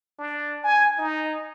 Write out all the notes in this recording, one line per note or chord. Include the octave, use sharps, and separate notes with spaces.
D4
G#5
D#4